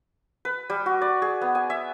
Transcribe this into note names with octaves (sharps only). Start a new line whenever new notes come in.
B4
G3
F#4
D5
G#4
B3
G#5
E5